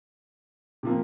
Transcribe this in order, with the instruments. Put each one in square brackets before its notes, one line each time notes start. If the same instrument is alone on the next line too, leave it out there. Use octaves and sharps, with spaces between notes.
[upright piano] C3 F3 A#3